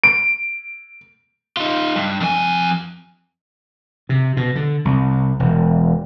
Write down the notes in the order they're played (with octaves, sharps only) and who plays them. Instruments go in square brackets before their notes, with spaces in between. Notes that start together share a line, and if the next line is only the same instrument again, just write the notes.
[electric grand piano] D7
[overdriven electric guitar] D#4 F4
G2
F2 G#5
[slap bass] C3
B2
D3
C2
E1